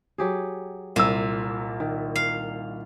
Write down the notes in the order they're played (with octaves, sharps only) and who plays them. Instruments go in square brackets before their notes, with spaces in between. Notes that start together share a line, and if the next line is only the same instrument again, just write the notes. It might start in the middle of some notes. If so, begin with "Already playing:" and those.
[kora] F#3 G4 G#4
[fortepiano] C2 E6 [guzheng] A#2
[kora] D#3
[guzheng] F5